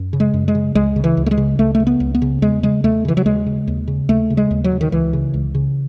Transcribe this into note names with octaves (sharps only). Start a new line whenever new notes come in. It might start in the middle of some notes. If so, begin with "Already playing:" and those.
Already playing: F#2
C#3
G#3
F#2
G#3
C#3
C#2 G#3
C#3
E3
C#2
A3
G#3
C#3
C#2 A3
A3
C#3
B3
C#2
B3
C#3
E2 G#3
C#3 G#3
E2 A3
C#3 E3
F#3
D#2 G#3
C#3
D#2
C#3
D#2 A3
C#3
G#3
D#2
F#3
C#3
D#3
C#2 E3
C#3
C#2
C#3